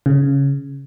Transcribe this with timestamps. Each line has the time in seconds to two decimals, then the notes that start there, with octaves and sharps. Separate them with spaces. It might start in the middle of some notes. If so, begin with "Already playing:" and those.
0.06 C#3